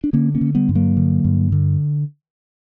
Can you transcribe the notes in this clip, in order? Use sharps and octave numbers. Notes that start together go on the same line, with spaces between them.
D4
D3 A#3 C#4
A#3 C#4
D3
G3 B3
G2
F#3 A#3
D3
G2
D3